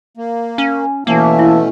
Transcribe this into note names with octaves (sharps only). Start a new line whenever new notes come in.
A#3
C#4
B2 E3 A3 A#3 C#4 E5 A5
E4